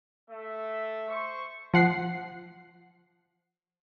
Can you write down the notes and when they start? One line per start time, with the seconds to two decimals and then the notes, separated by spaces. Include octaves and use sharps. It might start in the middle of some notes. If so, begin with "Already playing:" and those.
0.30 A3 E5
1.09 C5 C#6
1.74 F3 F#5 C7